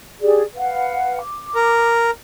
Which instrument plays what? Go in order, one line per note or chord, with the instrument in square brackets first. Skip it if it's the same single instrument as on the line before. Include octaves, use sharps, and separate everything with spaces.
[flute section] G4 G#4 D5
B4 F5 F#5
D6
[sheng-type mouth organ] A#4